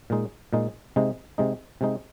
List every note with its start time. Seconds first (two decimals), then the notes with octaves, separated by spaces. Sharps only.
0.10 A#2 G#3 D#4
0.53 A#2 G#3 D#4
0.96 C3 G#3 D#4
1.38 C3 G#3 D#4
1.81 C3 G#3 D#4